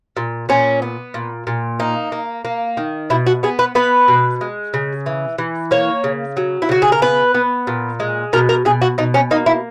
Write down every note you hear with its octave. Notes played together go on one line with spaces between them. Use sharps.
A#2
A#2 C#4
B3
A#2
A#2
A#3 D#4
A#3
A#3
D#3
B2 E4
F#4
B3 G#4
B4
B3 B4
B2
G#3
C#3
E3
E3
A#3 C#5
C#3
F#3
E4
C#3 F#4
G#4
A#4
B3 B4
B3
A#2
G#3
B2 A#4
A#4
B2 G#4
F#4
B2 D#4
C#4
A#3 D#4
E4